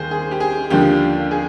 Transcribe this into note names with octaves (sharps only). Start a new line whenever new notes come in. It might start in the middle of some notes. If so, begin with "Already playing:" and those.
Already playing: D#2 D#3 G3 G#4 C5
G#4
G4
G#4
D#2 D3 F3 G4
G#4